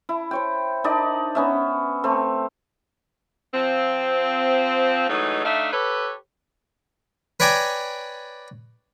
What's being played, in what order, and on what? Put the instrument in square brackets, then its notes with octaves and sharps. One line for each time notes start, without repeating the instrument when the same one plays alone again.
[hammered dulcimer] E4
C5 C#5 G5
D4 D#4 A#4 D5
B3 C#4 E5
A3 C4
[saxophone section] F3 C4
E3 F#3 G#3 A3 D#4
A3 D4 D#4 E5 F5
G4 A4 B4 C#5
[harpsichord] B4 C#5 D5 G5 G#5 A#5